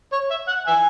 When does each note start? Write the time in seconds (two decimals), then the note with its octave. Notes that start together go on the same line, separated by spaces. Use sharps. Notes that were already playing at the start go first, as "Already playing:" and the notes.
0.13 C#5
0.30 E5
0.48 F#5
0.67 E5 G#5